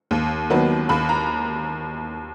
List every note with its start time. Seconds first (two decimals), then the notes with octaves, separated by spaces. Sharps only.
0.11 D#2
0.50 D#3 F#3 B3
0.89 D#2 B5
1.09 A#5